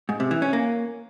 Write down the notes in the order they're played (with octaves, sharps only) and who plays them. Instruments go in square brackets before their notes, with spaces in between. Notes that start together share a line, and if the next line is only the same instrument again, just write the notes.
[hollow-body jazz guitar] G#2
C3
E3
C#4
A#3